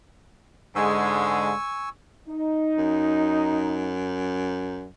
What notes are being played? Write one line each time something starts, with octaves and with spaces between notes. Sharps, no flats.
G#2 D3 G#3 G#5 C#6 E6
D#4
F#2